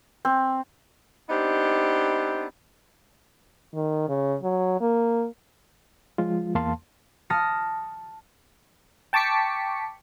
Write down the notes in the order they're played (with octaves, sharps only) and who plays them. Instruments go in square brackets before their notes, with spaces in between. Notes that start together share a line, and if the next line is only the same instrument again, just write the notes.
[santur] C4
[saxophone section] B3 C4 D4 D#4 G4
[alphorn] D#3
C#3
F#3
A#3
[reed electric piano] F3 G#3 F4
E2 A#3 F5 A5 C6
[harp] A5 D#6 F6 A#6 C#7
[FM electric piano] G5 A5 C#6 D6 B6 C#7